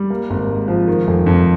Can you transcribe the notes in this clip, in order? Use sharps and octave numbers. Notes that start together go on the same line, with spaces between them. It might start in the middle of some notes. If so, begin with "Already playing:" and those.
Already playing: G3
A#3
G#1
G#2
F3
D#3
F1
F2